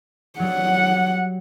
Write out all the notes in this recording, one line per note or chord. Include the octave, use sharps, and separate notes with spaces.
F#3 G3 F#5